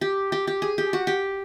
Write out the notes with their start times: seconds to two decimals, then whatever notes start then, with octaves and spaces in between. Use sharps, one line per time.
0.01 G4
0.32 G4
0.47 G4
0.62 G#4
0.78 G4
0.93 F#4
1.07 G4